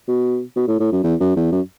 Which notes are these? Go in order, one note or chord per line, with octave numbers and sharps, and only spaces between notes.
B2
B2
A2
A2
F#2
E2
F#2
E2
F#2